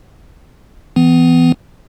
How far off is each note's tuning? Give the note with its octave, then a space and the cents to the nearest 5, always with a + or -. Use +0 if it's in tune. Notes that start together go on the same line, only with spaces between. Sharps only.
E3 +0 B3 +30